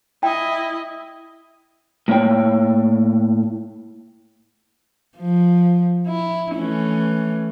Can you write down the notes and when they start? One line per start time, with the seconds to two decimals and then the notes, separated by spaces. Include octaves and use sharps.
0.23 E4 D#5 G5
2.08 A2 A#3 E4 C#5 G5
5.17 F3
6.07 E4
6.55 E3 A3 C#4